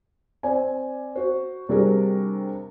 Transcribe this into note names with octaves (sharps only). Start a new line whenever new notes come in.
C4 D5 G#5
F#4 C5
C3 G3 D4 F#4 G#4 A#4